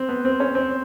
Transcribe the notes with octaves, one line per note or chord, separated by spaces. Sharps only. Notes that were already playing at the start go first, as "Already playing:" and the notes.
Already playing: C4
B3
C4
C#4
C4